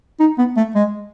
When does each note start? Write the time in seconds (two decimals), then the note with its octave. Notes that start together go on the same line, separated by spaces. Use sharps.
0.20 D#4
0.38 B3
0.57 A3
0.75 G#3